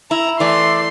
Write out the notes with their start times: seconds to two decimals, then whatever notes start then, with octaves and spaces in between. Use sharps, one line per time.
0.11 E4 A#5
0.40 E3 A3 D5 C6